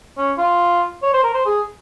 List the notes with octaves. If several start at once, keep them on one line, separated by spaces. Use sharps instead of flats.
C#4
F4
C#5
C5
A#4
C5
G#4